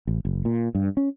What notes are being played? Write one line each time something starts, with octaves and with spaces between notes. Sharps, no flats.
A1
F#1
A#2
G2
C#4